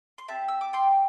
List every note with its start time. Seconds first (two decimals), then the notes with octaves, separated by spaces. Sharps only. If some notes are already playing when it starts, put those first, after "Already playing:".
0.18 C6
0.28 C4 G4 E5 A5
0.48 E6
0.61 D6
0.73 G5 C6